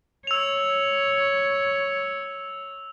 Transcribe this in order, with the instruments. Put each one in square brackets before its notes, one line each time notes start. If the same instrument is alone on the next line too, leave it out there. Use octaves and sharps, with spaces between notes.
[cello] C#5 [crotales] E6 F7